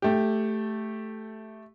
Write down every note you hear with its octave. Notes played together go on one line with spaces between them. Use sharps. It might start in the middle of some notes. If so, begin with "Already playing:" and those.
A3 G4